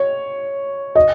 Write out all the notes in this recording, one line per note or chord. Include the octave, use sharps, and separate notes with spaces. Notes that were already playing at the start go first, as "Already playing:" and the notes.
Already playing: C#5
D#5